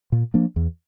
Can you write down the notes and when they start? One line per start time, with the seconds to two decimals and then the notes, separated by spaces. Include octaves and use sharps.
0.12 A#2
0.34 F3 A#3 D4
0.56 E2